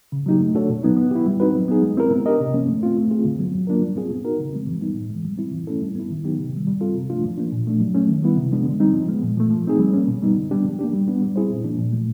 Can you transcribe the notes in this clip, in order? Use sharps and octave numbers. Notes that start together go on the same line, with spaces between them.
C#3
F#3 A#3 D#4 G4
A3
D4 F#4 A4 C#5
B2
F#3 B3 D#4
B3
E4 G4
G3
C4 D#4 F#4 B4
F#3
B3 D#4 G#4
G#3
C4 E4 G4 A#4
B3
D4 G4 A#4 D#5
C3
F3 A#3 C#4
A3
C4 F4
A3
C4 F4 G#4
D3
F#3 B3
F#3
A#3 D4 F4 A#4
G3
C4 F4 G#4
B3
D#4 F#4 A#4
C#3
F3 G#3 C4
E3
G3 B3 D#4
A2
E3 G#3
G3
C4 E4
E3
A3 C#4 E4 A4
G3
B3 E4
D#3
F#3 B3 D#4 G4
C3
D#3 G3
G3
C4 F4 A4
C3
F3 A3 D4 F4
F3
A#3 D4
A#2
F3 A3 D4
F#3
A3 C#4
D#3
G3 B3 E4
C3
F3 G#3 B3 D4
D3
G3 C4 D#4
F3
G#3 B3
A#2
F3 A3
F3
A3 C4 D#4 G#4
G3
A#3 C#4
B2
G3 B3 D#4
D3
G3 B3 D4 G4
F3
A#3 D4 G4
G3
B3 D4
G3
C4 E4 G#4 C5
A#2
F3 A#3 D4
A#2
F3 A3